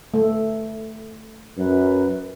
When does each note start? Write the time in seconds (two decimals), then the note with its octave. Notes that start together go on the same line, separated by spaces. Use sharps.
0.14 A3
1.58 F#2 B4